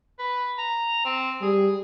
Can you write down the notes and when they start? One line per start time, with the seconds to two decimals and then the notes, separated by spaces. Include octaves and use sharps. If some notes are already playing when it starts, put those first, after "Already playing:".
0.19 B4
0.59 A#5
1.05 C4
1.42 G3 G#4